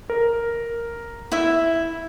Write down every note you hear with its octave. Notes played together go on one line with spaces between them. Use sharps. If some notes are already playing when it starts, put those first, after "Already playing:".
A#4
E4 E5